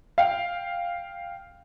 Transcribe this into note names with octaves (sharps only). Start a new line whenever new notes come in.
F5 G5